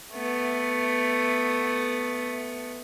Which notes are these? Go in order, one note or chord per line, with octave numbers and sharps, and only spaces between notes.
A3 B3